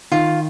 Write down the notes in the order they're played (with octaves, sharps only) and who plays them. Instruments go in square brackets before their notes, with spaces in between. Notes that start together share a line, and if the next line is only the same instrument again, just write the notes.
[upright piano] D#3 [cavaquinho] F4